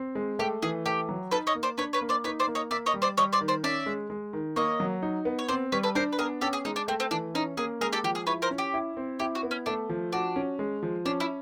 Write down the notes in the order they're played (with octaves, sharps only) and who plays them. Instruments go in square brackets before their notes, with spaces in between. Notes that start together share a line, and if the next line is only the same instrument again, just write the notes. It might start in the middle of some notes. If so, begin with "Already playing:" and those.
Already playing: [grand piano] C4
G#3
[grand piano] A3 [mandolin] G4
[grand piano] E3 [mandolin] G#4
[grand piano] A3 [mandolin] G4
[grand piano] F#3
[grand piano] D#4 [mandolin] A4 B4
[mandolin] C#5 D#5
[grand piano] A#3
[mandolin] C5 D5
[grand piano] D4 [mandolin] B4 C#5
[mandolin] B4 C#5
[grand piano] A#3
[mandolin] C5 D5
[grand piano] D#4 [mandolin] B4 C#5
[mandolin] C5 D5
[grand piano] A#3
[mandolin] C#5 D#5
[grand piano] A#3 [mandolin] D5 E5
[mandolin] C#5 D#5
[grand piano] G3
[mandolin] C5 D5
[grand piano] G3 [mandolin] C#5 D#5
[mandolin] C5 D5
[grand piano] D#3
[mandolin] C5 D5
[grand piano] C#4 [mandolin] D5 E5
[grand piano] G#3
G#3
D#3
[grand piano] A#3 [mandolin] C#5 D#5
[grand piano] F#3
D#4
B3
[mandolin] C#5
[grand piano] C4 [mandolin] C5 D5
[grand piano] G3 [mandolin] B4 C#5
[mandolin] A4 B4
[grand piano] D4 [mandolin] A#4 C5
[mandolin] B4
[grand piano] B3 [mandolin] G#4 A#4
[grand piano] C#4 [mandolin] G4 A4
[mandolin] G#4
[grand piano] G#3 [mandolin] D#4
[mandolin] D4
[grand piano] A3 [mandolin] C4
[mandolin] C4
[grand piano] E3 [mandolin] D4
[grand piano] C#4 [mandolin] D#4
[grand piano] A#3 [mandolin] G#4
[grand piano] G#3 [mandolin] G#4 A#4
[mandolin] G4 A4
[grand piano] F3 [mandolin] G4
[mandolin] G#4
[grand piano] E4 [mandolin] B4 C#5
[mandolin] A#4 C5
[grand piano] C#4
[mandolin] G4
[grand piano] E4
C4
[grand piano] E4 [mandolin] G4
[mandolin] F#4
[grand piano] B3
[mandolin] C#4
[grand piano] A3 [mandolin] D4
[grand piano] F3
[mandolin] D4 [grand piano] F#4
[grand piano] C#4
G#3
F3
[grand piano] C#4 [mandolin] D4
[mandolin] E4